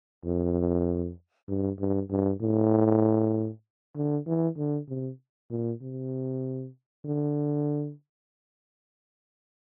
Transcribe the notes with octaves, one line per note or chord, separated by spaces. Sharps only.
F2
G2
G2
G2
A2
D3
E3
D3
C3
A#2
C3
D3